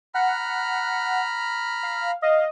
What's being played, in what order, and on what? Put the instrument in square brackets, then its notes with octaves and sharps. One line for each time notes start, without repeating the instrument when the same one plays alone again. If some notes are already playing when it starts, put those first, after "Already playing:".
[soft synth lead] F#5 [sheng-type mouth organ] A#5 B5 F6
[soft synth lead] F5
[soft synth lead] D#5 [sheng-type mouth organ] F5